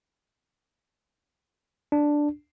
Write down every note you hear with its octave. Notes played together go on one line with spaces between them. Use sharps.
D4